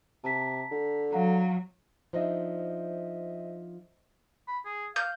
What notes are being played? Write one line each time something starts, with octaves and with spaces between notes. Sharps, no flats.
C3 A5 A#5 B6
D3
F#3 F5 F#5 A#5
F3 D4 D#4 C5 D#5 E5
B5
G#4
F5 G6